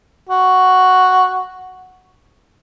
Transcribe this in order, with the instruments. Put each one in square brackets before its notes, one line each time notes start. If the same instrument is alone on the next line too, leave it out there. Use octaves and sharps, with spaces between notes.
[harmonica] F#4